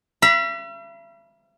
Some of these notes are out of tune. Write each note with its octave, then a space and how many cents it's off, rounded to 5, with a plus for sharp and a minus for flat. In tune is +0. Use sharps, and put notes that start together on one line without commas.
E5 +45 B5 -25